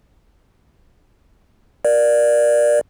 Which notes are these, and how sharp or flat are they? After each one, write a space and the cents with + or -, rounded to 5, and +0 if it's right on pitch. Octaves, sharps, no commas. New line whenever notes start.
A#4 +20 D5 +15